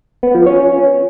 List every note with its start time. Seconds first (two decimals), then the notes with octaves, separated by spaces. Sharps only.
0.23 B3
0.35 F3
0.46 C#4